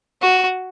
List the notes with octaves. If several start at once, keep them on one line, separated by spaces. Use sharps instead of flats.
F#4